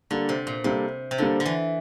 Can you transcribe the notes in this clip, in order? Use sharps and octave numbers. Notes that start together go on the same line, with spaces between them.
D3 G3 A#3 D4 A4
C3
A#2
C3 G3 A#3 D4 A4
C3
D3 G3 A#3 D4 A4
D3
E3